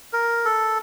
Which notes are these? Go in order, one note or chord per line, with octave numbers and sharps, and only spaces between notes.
A#4
A4